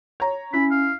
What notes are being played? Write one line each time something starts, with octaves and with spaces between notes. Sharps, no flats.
C#5 A#5
C#4 E4 B5
F5